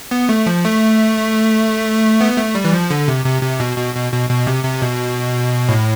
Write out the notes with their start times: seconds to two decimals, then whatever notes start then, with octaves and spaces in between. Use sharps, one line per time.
0.11 B3
0.29 A3
0.46 F3
0.64 A3
2.21 B3
2.37 A3
2.55 G3
2.65 E3
2.73 F3
2.91 D3
3.08 C3
3.25 C3
3.42 C3
3.60 B2
3.78 B2
3.95 B2
4.12 B2
4.29 B2
4.47 C3
4.64 C3
4.82 B2
5.69 A2